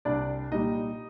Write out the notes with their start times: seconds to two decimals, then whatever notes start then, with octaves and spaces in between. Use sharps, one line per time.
0.05 C2 D4 D5
0.51 A#2 G3 D#4 D#5